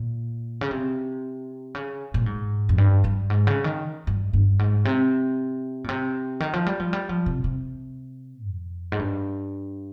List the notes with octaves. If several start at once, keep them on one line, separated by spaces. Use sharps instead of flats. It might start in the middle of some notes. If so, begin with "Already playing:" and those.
Already playing: A#2
C#3
C3
C#3
A#2
G#2
F2
G2
G2
G#2
C#3
D#3
G2
G2
G#2
C3
A#2
C3
D#3
F3
G3
F3
G3
F3
C3
C3
F2
G#2
G2